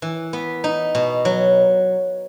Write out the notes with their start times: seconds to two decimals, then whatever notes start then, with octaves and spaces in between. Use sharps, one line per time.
0.02 E3
0.33 B3
0.64 D#4
0.95 B2
1.25 F#3